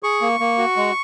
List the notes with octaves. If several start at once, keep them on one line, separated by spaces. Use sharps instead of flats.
G#4 C#6
A#3
A#3
F#4
G#3